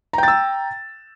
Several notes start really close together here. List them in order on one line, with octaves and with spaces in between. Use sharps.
A#5 G5 A6 E6